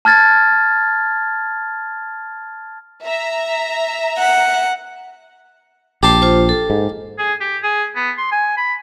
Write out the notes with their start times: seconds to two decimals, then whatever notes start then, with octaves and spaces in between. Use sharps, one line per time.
0.05 A5 F6 G#6 A6
3.04 E5 A#5
4.18 F#5
6.03 A#1 G4 A5 C6
6.22 F4 C5
6.49 A4
6.70 G#2
7.19 G#4
7.40 G4
7.63 G#4
7.96 B3
8.18 C6
8.32 G#5
8.57 B5